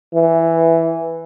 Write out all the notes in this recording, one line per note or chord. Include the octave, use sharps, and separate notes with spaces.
E3